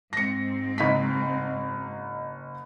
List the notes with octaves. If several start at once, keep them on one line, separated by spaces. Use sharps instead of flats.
G#2 C4 A#6 C#7
F#1 D#4 B6